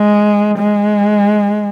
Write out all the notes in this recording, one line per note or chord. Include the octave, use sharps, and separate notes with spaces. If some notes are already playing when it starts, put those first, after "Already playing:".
Already playing: G#3
G#3